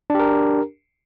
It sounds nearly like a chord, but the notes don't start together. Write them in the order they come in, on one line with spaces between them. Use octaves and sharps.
D4 G4 A#4